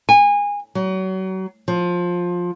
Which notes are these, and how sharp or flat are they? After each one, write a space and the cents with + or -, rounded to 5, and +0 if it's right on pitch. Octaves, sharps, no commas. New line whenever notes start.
G#5 -25
F#3 +35
F3 +15